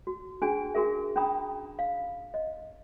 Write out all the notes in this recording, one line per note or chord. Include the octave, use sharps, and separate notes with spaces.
F#4
C#4 D4 F#4 G#4 G#5
F#4 G#4 A#4 E5
C#4 D4 G5 A#5 B5 D#6
F5
D#5